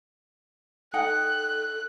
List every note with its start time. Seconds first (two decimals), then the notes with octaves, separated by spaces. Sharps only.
0.94 D#4 A4 F#5 G5 F#6